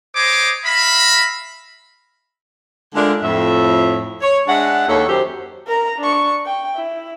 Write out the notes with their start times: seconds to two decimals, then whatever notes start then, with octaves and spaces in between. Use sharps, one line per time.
0.16 C5 C#5 D#5 G#5 D6 D#6
0.65 E5 F5 A#5 B5
2.95 D3 G#3 A3 D4 F4 A#4
3.23 F2 A2 E5
4.21 C#5
4.48 G#3 D4 E5 F#5
4.88 D#2 A4 C#5
5.08 F#2 G4 C5
5.67 A#4 A#5
5.99 D4 C#6
6.46 G5
6.76 E4